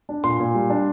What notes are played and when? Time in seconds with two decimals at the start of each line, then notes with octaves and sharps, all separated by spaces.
0.09 D4
0.24 A#2 C6
0.40 A#2
0.54 G3
0.70 D4